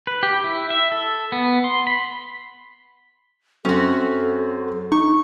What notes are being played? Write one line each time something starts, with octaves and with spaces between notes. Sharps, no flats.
B4
G4
E4
E5
A4
B3
C6
B5
F#2 C4 C#4 F#4 A4
D#4 C#6